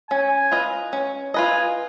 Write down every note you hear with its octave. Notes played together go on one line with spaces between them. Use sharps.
C#4 G#5
F4 B4 D#5
C#4
F4 B4 D#5 G#5